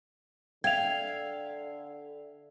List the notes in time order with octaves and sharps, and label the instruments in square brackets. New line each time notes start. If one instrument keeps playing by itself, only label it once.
[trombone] D3 [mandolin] E5 G5 [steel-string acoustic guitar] F5 [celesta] G#6 F7